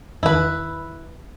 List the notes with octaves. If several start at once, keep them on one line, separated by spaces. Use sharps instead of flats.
E2 D#3 E4 B4